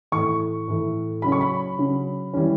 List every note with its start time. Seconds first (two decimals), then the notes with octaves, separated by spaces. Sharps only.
0.12 A2 E3 A3 C#6
0.68 A2 E3 A3
1.22 C#3 F#3 C#4 B5
1.32 C#6
1.41 B5
1.78 C#3 F#3 C#4
2.34 E3 G3 C#4